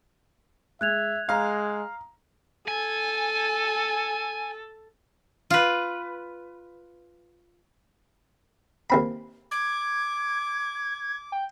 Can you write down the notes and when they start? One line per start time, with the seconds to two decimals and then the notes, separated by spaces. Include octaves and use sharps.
0.81 G#3 E5 F#6 G#6 F7
1.29 G#3 F5 A#5 D#6
2.68 A4 G#5
5.50 F4 B4
8.90 D#2 C4 B5
9.51 D6 G#6
11.32 G5